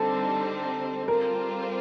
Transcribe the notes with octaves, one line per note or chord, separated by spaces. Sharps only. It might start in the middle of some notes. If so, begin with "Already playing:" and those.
Already playing: D3 G3 C4 D#4 A4
G3 C4 F4 A#4